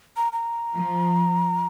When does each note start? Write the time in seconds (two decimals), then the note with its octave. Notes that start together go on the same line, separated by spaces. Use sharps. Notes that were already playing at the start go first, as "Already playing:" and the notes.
0.17 A#5
0.32 A#5
0.75 F3